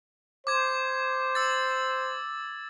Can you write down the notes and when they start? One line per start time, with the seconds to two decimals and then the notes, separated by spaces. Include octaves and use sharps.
0.47 C5 D6 G#6
1.35 E6 A6